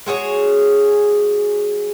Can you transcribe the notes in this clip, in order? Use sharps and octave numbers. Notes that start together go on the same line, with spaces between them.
G#3 F#4 G#4 C#5